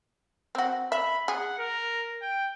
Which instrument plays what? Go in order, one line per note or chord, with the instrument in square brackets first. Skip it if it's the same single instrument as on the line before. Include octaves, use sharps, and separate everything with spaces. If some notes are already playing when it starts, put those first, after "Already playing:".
[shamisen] C4 F#4
[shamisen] E5 [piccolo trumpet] B5
[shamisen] G#4 [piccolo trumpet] F#5
[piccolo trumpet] A#4
G5